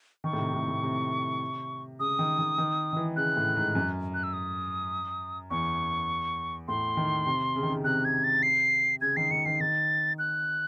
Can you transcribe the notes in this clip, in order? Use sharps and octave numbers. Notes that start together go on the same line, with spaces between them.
D#3 C#6
A2
C3
A2
A2
C3
C#3 D#6
D#3
D#3
D#3
D#3
E3
C#3 F#6
A2
G#2
F#2
F#6
E6
D#6
E2 C#6
A2 C6
D#3
C3
C#3
D#3
C#3
C3 F#6
G#6
A6
C7
C#3 G#6
D#3 C7
D#3 C#7
D#3 C7
D#3 A6
F#6